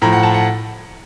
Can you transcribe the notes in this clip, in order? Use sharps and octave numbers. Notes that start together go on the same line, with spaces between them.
A2 F3 A#5
F#5
A5
F#5